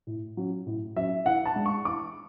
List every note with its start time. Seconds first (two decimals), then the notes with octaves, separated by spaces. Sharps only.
0.07 A2
0.37 F#3 C#4
0.66 A2
0.96 F#3 C#4 E5
1.26 E3 F#5
1.46 A5
1.56 G#3 D4
1.66 C#6
1.85 E3 D6